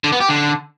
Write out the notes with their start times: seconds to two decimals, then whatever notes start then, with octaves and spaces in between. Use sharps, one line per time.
0.04 D3
0.12 B3
0.20 G4
0.29 D3